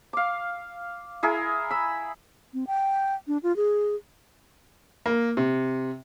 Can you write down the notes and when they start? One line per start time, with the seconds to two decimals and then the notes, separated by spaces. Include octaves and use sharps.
0.13 F5 D6
1.23 E4 G#4 A#4
1.70 B5 E6
2.54 C4
2.67 G5
3.27 D4
3.43 F4
3.56 G#4
5.06 A#3
5.37 C3